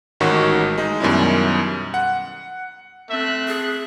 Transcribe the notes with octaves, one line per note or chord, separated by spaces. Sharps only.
A1 G#2 D#3 F#4 C#5 C#6
G#3 D#4
F#2 B2 D#3 G3 C#4 E4
F#5
A3 C4 E5 F#6
G#4